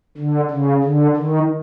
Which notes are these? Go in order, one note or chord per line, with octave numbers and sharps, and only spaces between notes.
D3
C#3
D3
D#3